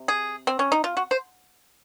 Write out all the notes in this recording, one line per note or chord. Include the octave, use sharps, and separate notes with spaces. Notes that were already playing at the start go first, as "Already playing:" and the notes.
Already playing: C3
G#4
C4
C#4
D#4
F4
F#4
C5